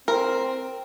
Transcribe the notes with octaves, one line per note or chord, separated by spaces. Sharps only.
C4 A#4